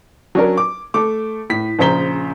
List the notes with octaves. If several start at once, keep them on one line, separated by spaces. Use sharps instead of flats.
F#3 C#4 D4 A#4
D6
A3 A4 D6
A2 B6
A#1 C#3 C5 A#5 B6 G7